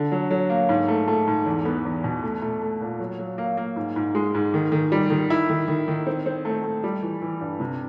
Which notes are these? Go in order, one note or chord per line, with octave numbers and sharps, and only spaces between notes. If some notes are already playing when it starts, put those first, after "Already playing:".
Already playing: D3
F#3
F#3
A#3
G#2
A3
A3
G#2
E2
B3
E2
B2
A3
A3
A3
A#2
F#3
F#3
A#3
A#3
G#2
G#2
G#3
G#2
D#3
D#3
G3
D#3
E4
D#3
D#3
D#3
C4
C4
A3
A3
G3
E3
E3
G2
C3